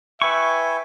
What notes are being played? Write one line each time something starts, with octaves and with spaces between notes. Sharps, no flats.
E4 B4 E5 G5 G#5 C#6